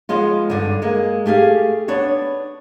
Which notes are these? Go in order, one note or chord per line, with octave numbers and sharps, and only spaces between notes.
F3 G#3 B3 F4
G2 D3
G#3 A#3
A3 G4 G#4 F5
B3 D4 C#5